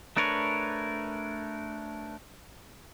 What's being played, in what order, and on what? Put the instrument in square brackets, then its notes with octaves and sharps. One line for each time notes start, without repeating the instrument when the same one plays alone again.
[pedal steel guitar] A3 D4 A#4 B4 C#5